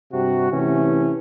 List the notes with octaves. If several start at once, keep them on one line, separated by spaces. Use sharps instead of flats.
G2 C3 F#4
C3 E3 A3 C#4